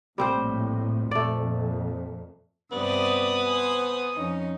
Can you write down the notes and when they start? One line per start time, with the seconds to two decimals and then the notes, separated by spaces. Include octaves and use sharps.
0.18 A#1 A2 G3 C4 C5
1.11 F2 A#2 A3 D5
2.72 G2 C3 B3 D5 D#6
3.47 C5 G#5
4.15 F2 C#4 D#4